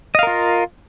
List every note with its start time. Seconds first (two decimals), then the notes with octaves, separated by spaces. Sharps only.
0.15 D#5
0.19 F5
0.23 A#4
0.27 F4